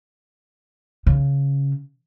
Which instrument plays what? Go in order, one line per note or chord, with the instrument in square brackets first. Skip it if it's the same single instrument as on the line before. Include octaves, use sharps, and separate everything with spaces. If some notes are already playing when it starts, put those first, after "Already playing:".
[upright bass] C#3